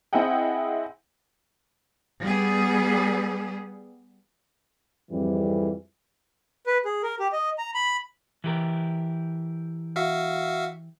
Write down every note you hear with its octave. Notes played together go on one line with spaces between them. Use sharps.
C4 E4 G#4 D#5 F#5 G5
G3 B3 G#4
F2 G#2 E3 G3
B4
G#4
A#4
G4
D#5
A#5
B5
E3 G4 A#4
F#4 E5 F5